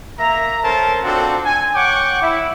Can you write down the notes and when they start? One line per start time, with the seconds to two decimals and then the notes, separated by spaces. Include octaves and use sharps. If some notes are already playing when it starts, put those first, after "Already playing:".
0.18 A#3 E5 A#5
0.62 C#4 A4 A#4 C5 A5
1.03 C4 D4 F4 F#4 A4
1.45 G#5
1.74 C#5 F#5 G5 C#6 D6
2.22 E4